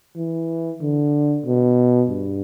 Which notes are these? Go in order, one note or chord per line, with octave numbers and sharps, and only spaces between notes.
E3
D3
B2
G2